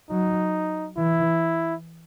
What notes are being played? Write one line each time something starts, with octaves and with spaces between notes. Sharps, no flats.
F#3 D#4
E3 E4